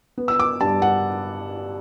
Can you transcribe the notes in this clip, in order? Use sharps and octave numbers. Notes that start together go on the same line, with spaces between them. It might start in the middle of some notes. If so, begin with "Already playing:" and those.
B3
E6
D6
G2 A5
F#5